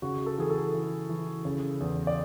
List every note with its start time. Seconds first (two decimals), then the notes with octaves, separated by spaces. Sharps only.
0.02 C#3 F#4
0.26 A4
0.38 E3 G#4
0.50 A4
0.74 E3
1.09 E3
1.45 C#3
1.80 E2
2.07 D5